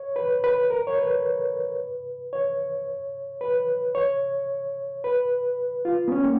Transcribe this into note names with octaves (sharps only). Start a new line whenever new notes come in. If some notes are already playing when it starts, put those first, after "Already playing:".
Already playing: C#5
B4
B4
A#4
C#5
B4
C#5
B4
C#5
B4
F4
B3
C#4
A#3